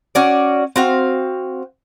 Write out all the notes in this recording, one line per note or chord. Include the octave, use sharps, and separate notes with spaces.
C#4 F#4 D5
C4 F#4 F5